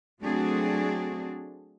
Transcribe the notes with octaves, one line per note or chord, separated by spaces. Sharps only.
F#3 A3 C4 D4 F#4 G#4